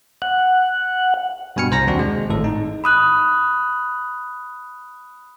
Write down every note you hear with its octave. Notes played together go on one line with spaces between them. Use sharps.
F#5
G2 B2 G#5 F6 C#7
C2 C5 A#5 A#6
D#2 C4 D4 F#4
G#3
G#1 A2 A4
D#4
B5 D#6 F#6